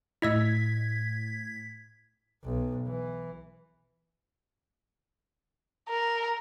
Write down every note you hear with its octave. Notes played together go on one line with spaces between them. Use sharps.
A2 E4 D#5 E6 G#6 B6
B1
E3
A#4